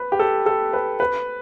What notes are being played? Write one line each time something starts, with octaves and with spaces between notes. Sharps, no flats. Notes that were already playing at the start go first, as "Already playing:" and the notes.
Already playing: B4
G4
A4
A4
B4
B4